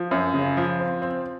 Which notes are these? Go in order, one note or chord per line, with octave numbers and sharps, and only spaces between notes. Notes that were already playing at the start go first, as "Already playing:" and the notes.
Already playing: F3
F#2
C#3
F3
C4
C4